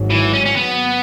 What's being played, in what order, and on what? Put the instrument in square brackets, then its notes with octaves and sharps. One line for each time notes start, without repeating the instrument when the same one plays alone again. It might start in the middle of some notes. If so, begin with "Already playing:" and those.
Already playing: [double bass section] G#1 G#2 F#3
[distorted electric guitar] E3
C#4
C#4
B3